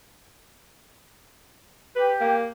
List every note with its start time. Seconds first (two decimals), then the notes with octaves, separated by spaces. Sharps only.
1.96 G4 B4
2.20 A#3